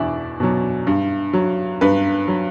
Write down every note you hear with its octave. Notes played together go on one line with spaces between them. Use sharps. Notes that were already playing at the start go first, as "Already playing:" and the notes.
Already playing: E2 B2 D4 E4
B2 F#3
G2
F#3
G2 B4
F#3